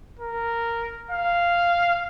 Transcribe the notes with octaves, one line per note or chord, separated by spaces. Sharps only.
A#4
F5